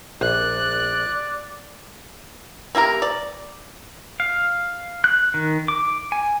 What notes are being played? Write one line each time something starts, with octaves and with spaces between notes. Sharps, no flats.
A#1 D5 F#6
A#3 E4 G4 A#4
D5
F5
F#6
D#3
D6
G#5